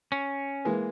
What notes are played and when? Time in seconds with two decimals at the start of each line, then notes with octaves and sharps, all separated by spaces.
0.12 C#4
0.65 E3 G#3 A#3